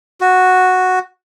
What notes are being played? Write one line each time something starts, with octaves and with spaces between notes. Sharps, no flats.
F#4